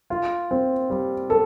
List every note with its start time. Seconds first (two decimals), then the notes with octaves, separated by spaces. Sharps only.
0.10 F4
0.51 C4
0.90 G3
1.30 A4